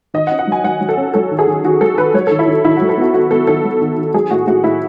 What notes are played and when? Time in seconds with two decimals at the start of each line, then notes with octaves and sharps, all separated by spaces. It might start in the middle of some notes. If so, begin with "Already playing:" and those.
0.14 D#3 D#5
0.27 F#5
0.31 C#4
0.39 F#5
0.47 F#3 G#5
0.64 F#3 F#5
0.81 F#3
0.89 A4
0.97 C#4
1.14 F#3 A4
1.31 D#3
1.39 G#4
1.47 D#3
1.64 D#3 F#4
1.81 F#3 A4
1.98 D#3 B4
2.14 F#3 C#5
2.27 D#3 A4
2.39 E4
2.47 D#3
2.65 D#3 E4
2.77 F#3 F#4
2.89 A4
2.97 B3 F#4
3.14 B3 F#4
3.31 B3 A4
3.47 D#3 A4
3.64 F#3
3.81 D#3
3.97 D#3
4.14 F#3 G#4
4.31 A2 F#4
4.47 A2 F#4
4.64 A2 E4